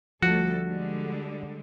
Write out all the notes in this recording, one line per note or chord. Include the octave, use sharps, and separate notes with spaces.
D2 F3 G3 F#4 A4
D3 G3 G#3